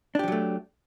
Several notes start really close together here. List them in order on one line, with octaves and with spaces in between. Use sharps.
D4 G4 F3 F#3 A3